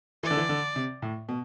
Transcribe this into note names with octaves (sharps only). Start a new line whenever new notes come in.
E3 D5
D3
E3
D3
C3
A2
B2